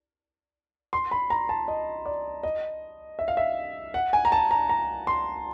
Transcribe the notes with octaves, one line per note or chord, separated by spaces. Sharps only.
C6
B5
A#5
A5
D#5
D5
D#5
E5
F5
E5
F#5
G#5
A#5
A5
A#5
A#5
C6